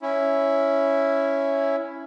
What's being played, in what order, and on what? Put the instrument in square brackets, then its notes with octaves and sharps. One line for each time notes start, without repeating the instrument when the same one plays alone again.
[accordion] C#4 E4